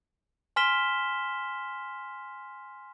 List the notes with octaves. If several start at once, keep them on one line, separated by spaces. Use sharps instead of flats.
G#5 C6 F6 B6 E7 G7